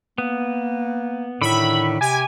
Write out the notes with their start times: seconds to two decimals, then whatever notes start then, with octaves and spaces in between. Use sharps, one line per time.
0.18 A#3 B3
1.42 A2 D3 D#3 E5 B5
2.01 C3 G4 G#5